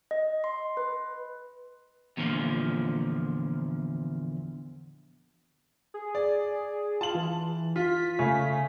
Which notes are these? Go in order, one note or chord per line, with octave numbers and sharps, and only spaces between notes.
D#5
C6
B4
E2 A#2 D3 E3 F3
G#4
D5
F4 A5 F#7
E3
F4 B6
C#3 A3 C#4